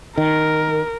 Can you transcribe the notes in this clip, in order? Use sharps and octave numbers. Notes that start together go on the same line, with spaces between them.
D#3 A#4